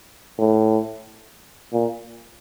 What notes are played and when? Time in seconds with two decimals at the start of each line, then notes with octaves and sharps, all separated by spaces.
0.39 A2
1.73 A#2